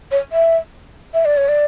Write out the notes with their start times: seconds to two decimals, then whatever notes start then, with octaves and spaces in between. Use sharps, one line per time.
0.11 C#5
0.32 E5
1.14 E5
1.25 D5
1.37 C#5
1.49 D5